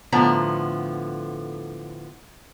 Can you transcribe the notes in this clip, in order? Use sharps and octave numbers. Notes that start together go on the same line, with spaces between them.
A2 D3 F3 B3 A#5